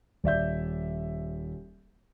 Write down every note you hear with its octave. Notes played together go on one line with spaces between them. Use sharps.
D#1 D5 E5 G6